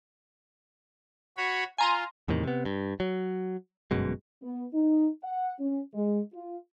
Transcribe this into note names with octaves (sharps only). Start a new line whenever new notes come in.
F#4 C#5 B5
F4 G#5 A#5 C6
E2 A2 C3 D#3
C3 B3
G2
F#3
G1 F#2 B2 G#3
B3
D#4
F#5
C#4
G#3
F4